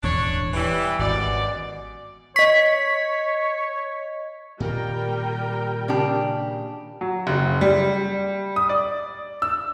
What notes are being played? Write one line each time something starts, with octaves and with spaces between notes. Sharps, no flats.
D#1 E2 G#2 D4 C#5
E3 G3
G#1 F#2 B2 D5
C#5 D#5 C#6 B6
A#2 D#3 G3 A#3 A#4 G5
C#3 D4 G4
F#3
F#1
G3
D#6
D5
E6